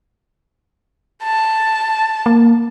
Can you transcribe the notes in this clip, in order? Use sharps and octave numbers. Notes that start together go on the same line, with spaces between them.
A5
A#3